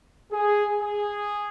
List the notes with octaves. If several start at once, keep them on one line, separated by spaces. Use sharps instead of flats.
G#4
G#4